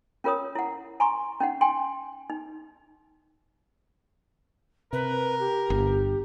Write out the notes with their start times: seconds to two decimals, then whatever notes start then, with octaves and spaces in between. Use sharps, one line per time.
0.24 C#4 F4 A#4 C#5 D#6
0.55 E4 F#5
1.00 G#5 A#5 C6 C#6
1.40 C#4 D#4 F#5
1.61 G5 G#5 C6
2.30 D#4
4.93 C3 A#4 B4
5.39 G4
5.70 G1